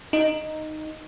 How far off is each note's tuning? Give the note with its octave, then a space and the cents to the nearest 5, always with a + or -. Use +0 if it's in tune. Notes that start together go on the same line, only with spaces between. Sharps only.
D#4 -5